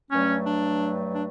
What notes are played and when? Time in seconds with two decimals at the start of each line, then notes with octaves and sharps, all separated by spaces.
0.11 G2 F#3 A3 C#4
0.46 D4
1.15 D4